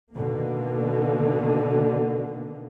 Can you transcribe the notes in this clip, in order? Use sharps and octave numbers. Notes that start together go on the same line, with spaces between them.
B2 D3 D#3 A#3